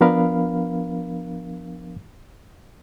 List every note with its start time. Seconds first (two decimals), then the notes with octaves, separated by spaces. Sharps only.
0.01 F3 B3 D4 A#4 F5 B5